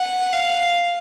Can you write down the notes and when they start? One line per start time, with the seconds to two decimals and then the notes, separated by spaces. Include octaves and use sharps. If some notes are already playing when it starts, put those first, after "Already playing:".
Already playing: F#5
0.33 F5